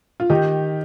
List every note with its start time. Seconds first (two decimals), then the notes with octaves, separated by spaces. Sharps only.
0.20 F4
0.30 D#3 D#4 G4